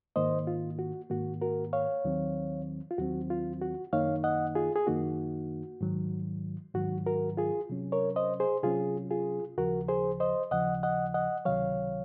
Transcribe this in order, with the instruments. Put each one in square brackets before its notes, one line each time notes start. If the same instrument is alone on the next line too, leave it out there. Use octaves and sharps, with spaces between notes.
[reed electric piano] G#2 D#3 A#3 C5 D#5
F4
F#4
G#2 D#3 A#3 F#4
F#4 A#4
C#5 F5
D#2 D#3 F#3 C4
F4
D#2 D#3 F#3 C4 F#4
F4
F#4
F#2 D#3 A#3 D#4 C#5 F5
D#5 F#5
F4 G#4
G#4
F#2 D#3 A#3 D#4 F#4
G#2 D#3 F#3
G#2 D#3 F#3 F#4
F#4 A#4
F4 G#4
C3 F#3 C#4
A#4 C#5
C5 D#5
G#4 C5
C3 F#3 C#4 F4 G#4
F4 G#4
D#2 C#3 F3 F#4 A#4
G#4 C5
C5 D#5
D#2 C#3 F3 D#5 F#5
D#5 F#5
D#5 F#5
C#2 C3 D#3 F#3 C#5 F5